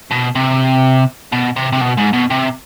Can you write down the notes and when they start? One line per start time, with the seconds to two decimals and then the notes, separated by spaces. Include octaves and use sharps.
0.11 B2
0.35 C3
1.33 B2
1.56 C3
1.73 C3
1.81 B2
1.97 G#2
2.13 B2
2.30 C3